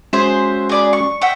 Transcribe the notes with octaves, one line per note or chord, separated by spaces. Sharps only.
G#3 C#4 F#4 G#4 C5 E5
G#4 D5 B5
C#6
E5 F#5 G5